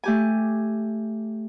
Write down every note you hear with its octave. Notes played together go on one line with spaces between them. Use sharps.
A3 G4 G#5